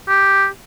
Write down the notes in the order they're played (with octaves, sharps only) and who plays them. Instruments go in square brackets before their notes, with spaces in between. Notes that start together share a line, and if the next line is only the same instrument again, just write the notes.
[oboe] G4